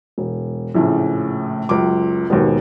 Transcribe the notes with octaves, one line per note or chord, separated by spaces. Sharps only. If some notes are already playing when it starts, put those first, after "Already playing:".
E1
A#1 A2 C#3
C#2 F#2 D6
D#2 G#2 B2